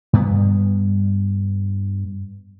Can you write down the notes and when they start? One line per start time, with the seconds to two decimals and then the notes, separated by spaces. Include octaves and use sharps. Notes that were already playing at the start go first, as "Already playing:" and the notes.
0.13 G2 B3